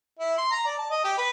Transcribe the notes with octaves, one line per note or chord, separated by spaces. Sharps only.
E4
C6
A#5
D5
A5
D#5
G4
B4